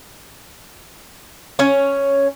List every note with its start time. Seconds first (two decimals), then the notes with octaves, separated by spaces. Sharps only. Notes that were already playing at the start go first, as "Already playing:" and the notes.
1.59 C#4 C#5